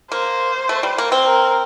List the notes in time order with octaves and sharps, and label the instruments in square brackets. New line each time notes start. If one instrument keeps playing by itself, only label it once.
[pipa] A#3 [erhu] C5
[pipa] A3
G3
A#3
C4
[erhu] A#4